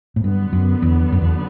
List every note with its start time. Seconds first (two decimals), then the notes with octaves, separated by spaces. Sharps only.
0.16 A2
0.24 G2 D3 F#3 B3
0.53 F#2
0.82 E2
1.12 F#2
1.21 E2